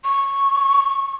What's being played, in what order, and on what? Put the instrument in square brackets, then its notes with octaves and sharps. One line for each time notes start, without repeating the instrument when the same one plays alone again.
[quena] C#6